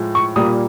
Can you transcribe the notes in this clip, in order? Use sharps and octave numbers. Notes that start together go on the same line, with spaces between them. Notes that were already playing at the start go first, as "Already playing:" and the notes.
Already playing: A2 F3 G#3
C#6
A#2 G3 A#3 D#6